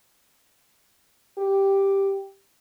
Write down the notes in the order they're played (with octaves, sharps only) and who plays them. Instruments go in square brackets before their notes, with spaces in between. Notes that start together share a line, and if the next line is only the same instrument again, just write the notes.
[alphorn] G4